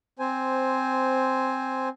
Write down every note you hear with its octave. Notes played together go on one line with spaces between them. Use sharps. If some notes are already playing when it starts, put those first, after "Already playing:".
C4 C5 G#5